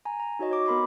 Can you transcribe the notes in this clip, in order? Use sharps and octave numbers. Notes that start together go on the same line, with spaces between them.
G#5 A#5
A#5
D#4 F#4 C#5 D#5
C#5 D6
B3 A#4 B5 C6 D6